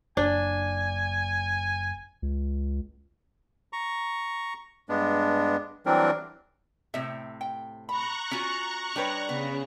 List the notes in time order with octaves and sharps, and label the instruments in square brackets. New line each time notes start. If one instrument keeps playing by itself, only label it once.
[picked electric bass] F#1 [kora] D4 [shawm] G#5
[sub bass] C#2
[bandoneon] A#5 C#6
G2 G#3 B3 D4
E3 F#3 G3 C4 D4 A#4
[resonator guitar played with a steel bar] A2 C3 [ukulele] E5
[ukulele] G5
[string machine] A#5 C#6 F#6 [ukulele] B5
[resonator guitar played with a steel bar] C#4 F4 F#4
[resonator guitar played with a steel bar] G3 C#5 [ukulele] D4 G4 B4
[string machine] C#3 [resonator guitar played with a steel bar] B3